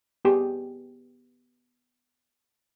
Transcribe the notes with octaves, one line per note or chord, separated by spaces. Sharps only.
B3 G4 G#4 G5